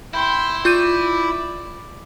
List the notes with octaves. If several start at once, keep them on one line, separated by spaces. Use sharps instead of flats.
E4 G5 C6
F4 D5 G6 D#7